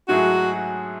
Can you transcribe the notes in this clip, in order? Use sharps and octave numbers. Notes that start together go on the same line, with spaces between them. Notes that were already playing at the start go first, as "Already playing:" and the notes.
G#2 F#3 A3 E4 F#4 G#4